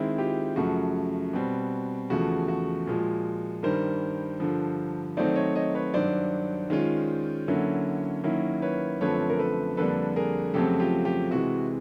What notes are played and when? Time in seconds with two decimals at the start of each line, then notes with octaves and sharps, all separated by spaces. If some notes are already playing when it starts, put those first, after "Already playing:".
Already playing: D#3 G#3 C4 E4
0.18 F4 G4
0.56 F#2 C#3 F3 A3 F#4
1.33 B2 G3 C4
2.10 E2 C#3 F3 A3 F#4
2.48 F#4
2.87 A#2 F3 G#3
3.63 G2 D#3 G3 A#4 C5
4.40 G2 D3 F3
5.17 D#3 F#3 A3 C4 D#4 C5 D5
5.36 C#5 D#5
5.55 C#5 D#5
5.75 B4 C#5
5.94 G2 D#3 F#3 C5 D5
6.70 D#3 G#3 C#4 F4
7.48 D3 F#3 A#3 C#4 E4
8.24 D#3 F#3 A#3 C#4 E4
8.62 B4 C#5
9.01 F#2 D3 F3 A3 C4 B4 C#5
9.29 A#4
9.39 A4 B4
9.77 F2 D3 G3 A#3 D4 A4 B4
10.16 G#4 A#4
10.54 F2 C#3 F#3 A3 C4 G4 A4
10.79 F4 G4
11.05 F4 G4
11.31 C3 E3 G#3 F#4